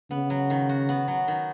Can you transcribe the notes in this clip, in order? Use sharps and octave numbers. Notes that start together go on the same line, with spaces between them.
C#3 B3
F#3
D#3
F#4
B3
F#3
D#3